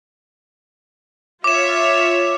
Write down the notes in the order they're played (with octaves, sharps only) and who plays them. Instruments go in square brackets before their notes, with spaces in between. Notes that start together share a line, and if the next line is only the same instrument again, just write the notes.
[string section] F4 C#5 E5 [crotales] D6 E7